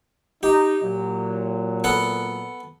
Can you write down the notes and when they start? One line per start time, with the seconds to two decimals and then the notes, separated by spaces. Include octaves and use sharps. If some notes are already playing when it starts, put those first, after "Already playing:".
0.43 D#4 G4
0.82 A#2 F#3
1.84 B3 A4 F#5